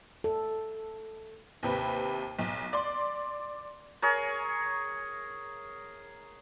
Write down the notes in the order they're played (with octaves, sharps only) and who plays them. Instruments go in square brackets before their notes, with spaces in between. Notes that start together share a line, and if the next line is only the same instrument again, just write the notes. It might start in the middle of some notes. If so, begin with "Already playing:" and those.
[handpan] A4
[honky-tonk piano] D#2 C3 B4
B1
D5 C6
[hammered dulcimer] G#4 A#4 C#5